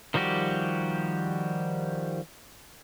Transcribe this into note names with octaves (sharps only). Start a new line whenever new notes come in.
D#3 F3 G3 F#4 G4